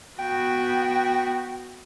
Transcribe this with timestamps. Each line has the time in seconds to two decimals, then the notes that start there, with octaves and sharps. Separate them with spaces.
0.19 B3 F#4 G5